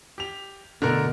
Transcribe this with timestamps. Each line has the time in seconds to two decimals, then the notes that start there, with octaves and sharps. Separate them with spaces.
0.18 G4 F7
0.82 B2 D3 A3 A#4